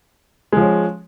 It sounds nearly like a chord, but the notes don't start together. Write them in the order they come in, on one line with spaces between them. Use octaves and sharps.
G#3 F3 C#4